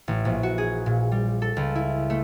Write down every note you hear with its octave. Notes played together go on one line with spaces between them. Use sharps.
A1
A#1
F#4
G#4
A#2
G3
A4
C#2
E4
A3